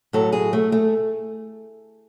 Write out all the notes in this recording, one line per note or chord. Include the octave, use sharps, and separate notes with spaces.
A2 F#3 A4
G#4
A3
A3